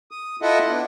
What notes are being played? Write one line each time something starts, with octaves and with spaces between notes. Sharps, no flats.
D#6
E4 F4 A4 D#5 E5 F#5
B3 D4